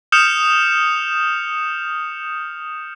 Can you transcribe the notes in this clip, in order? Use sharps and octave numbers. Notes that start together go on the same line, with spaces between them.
D#6 F6 G6 C#7 E7 F7